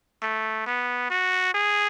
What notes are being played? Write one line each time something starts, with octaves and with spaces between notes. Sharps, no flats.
A3
B3
F#4
G#4